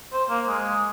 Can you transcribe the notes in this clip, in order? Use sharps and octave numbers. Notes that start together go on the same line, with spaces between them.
C5
A#3
G#3